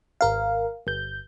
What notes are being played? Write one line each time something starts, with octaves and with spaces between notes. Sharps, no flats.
G#1 A#4 F5
G1 G6